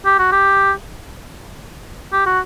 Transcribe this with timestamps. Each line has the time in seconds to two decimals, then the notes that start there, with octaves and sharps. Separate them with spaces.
0.06 G4
0.19 F#4
0.32 G4
2.13 G4
2.26 F#4